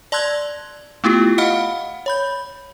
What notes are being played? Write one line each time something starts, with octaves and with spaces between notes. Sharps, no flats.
D5 A5 C6 E6 F#6 G#6
A3 B3 E4 F4 G4
D#5 F5 F#5 B5 F6
C#5 B5 G6